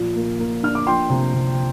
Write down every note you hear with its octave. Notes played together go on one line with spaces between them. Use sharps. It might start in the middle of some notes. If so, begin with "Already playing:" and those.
Already playing: A#2 F3
A#3
A#3
D4 F6
D6
F3 G5 C6
C3
C3